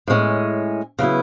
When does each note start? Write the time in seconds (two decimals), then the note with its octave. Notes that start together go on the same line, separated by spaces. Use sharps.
0.08 A2 G#3 C#4
0.99 C#3 F#3 B3 E4